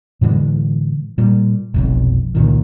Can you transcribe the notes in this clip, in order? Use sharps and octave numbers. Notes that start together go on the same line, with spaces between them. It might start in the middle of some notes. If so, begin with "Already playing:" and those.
A2 D3 E3 G#3
A#2 G3
F1 B1 F2
C#2 A#2 D#3